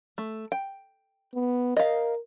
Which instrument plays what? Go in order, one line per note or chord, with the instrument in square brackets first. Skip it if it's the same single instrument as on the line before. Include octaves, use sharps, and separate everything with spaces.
[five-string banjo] A3
G5
[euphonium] B3
[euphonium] A#4 [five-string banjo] D#5 F5